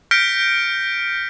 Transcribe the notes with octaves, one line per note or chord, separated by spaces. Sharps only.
F6 G6 A#6 B6 C#7 D7